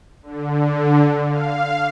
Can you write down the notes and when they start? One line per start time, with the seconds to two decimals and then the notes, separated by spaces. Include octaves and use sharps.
0.23 D3
1.27 F5